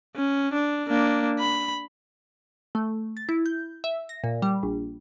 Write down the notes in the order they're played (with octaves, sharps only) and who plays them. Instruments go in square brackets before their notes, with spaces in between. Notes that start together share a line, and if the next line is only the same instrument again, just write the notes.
[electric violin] C#4
D4
A#3 D4
B5
[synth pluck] A3
A6
E4
G6
E5
A#6
A#2
G3
A#1